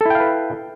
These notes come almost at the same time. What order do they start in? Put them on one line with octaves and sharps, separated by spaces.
A4 E4 G5 F5 B4